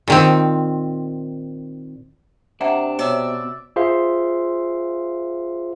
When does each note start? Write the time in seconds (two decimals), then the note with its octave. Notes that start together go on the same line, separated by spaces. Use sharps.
0.08 A#2 D#3 C4
2.61 C3 D4 E5 F#5 A#5
2.99 B2 C#5 D5 E5
3.76 F4 G#4 C5 E5 F5 C6